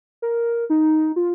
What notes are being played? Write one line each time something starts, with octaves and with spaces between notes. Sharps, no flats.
A#4
D#4
F4